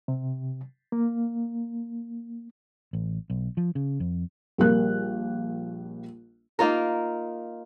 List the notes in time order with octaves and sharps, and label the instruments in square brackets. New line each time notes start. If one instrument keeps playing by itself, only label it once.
[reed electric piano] C3
A#3
[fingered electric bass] A1
B1
F3
C#3
F2
[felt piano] A#1 G3 A#3 F#6
[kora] A#3 D#4 F4 A#4